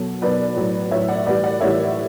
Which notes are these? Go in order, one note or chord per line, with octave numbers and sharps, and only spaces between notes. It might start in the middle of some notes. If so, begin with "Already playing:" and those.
Already playing: B2 F#3 A4
B2 F#3 B4 D5
A2 F#3
A2 F#3 C#5 E5
D5 F#5
A2 E3 G3 B4 D5
D5 F#5
A2 E3 G3 C#5 E5